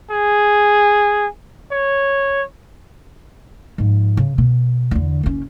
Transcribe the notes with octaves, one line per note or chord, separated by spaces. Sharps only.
G#4
C#5
G#2 F3
C#3
B2
E2 D3
F#1 C#4